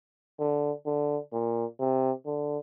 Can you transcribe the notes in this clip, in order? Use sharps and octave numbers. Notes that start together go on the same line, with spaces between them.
D3
D3
A#2
C3
D3